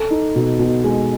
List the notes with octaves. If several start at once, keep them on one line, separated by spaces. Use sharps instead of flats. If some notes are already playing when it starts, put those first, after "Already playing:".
Already playing: A4
D#4
B2
B2
G#3